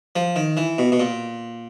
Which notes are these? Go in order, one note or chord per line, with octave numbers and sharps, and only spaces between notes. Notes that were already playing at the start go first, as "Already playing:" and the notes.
F3
D#3
E3
B2
B2
A#2